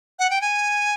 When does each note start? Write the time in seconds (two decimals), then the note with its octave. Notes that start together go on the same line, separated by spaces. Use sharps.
0.19 F#5
0.30 G5
0.41 G#5